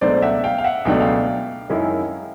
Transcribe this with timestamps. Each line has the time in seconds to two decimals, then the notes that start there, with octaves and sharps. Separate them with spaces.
0.01 C#2 B2 F#3 A3 D4 C5 D5
0.22 E5 F#5
0.44 F5 G5
0.58 F5
0.64 E5 F#5
0.85 C#2 B2 F#3 A3 D4 G5
1.00 F5 G5
1.70 F#2 D#3 G#3 C#4 E4